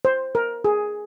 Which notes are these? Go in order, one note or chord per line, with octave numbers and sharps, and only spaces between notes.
C5
A#4
G#4